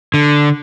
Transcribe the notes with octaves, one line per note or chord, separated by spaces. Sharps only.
D3